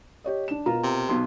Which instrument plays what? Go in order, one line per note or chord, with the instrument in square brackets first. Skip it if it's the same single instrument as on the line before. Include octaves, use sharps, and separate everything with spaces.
[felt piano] G4 C#5 D#5
D4 E7
[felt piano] B2 A#4 A#5 [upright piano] F4
[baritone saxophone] C3
[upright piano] B1 B2 C6